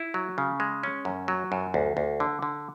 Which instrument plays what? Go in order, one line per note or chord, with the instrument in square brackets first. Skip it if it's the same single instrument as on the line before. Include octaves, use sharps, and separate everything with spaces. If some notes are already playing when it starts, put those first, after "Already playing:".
Already playing: [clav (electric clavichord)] E4
F#3
C#3
G#3
C#4
F#2
F#3
F#2
D2
D2
D3
D3